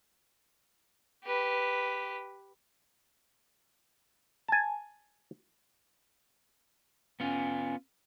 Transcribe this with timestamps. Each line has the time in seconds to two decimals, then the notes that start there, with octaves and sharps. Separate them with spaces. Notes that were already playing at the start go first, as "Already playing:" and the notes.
1.24 G4 B4
4.48 G#5 A5
7.20 B3 C#4 F4